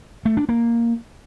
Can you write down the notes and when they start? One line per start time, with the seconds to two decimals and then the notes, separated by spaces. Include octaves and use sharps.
0.25 A3
0.37 D4
0.49 A#3